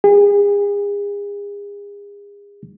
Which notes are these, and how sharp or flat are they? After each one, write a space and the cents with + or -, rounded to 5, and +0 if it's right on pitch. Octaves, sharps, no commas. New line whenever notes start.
G#4 -40